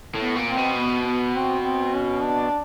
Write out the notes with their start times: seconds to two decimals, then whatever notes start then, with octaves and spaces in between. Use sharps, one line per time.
0.15 A2
0.21 B3
0.36 A#2
0.50 C4
0.57 B2
0.79 B3
1.07 B3
1.36 C4
1.65 C4
1.94 C#4
2.22 D4